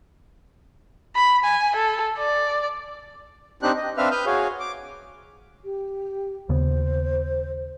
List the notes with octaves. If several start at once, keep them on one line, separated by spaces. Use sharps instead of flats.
B5
G#5
A4
D5
C4 D4 D#4 G4 F#6
D#5
C4 D4 B4 E5 F5 F6
B4 D#6 F6 G6
F#4 G#4 C#5 F5
D6
G4
D#2 C#3 B3 C5